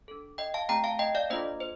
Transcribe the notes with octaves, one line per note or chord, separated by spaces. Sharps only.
D4 A4
D#5 G5
F5 A5
A3 C4 G4 G5 A#5
F5 A5
D#5 G5
D5 F5
A#3 D4 F4 A4 C5 D#5
C5